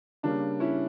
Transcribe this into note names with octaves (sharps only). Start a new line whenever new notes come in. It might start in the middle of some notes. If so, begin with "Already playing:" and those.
C#3 G3 A#3 C#4 D4
C#4 E4